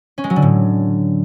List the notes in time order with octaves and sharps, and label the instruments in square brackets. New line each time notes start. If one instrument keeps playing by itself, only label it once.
[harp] C#4
G#3
F#3
D3
A2